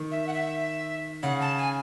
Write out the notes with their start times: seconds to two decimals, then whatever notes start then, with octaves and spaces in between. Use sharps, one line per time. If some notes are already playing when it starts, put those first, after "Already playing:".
Already playing: D#3
0.12 E5
0.27 F#5
0.34 E5
1.23 C#3 F#5
1.41 A5
1.57 G#5